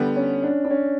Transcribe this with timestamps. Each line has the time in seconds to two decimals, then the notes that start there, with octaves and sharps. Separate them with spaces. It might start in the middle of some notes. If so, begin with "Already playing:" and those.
Already playing: D3 G3 B3
0.16 C#4
0.43 D4
0.65 D4
0.70 C#4